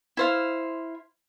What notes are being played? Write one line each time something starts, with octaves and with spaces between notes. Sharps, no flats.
E4 C5 F5